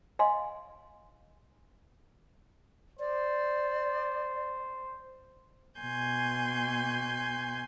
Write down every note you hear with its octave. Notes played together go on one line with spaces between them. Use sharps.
D#5 F5 G#5 C6
C5 D5
B2 G#5 C6 G6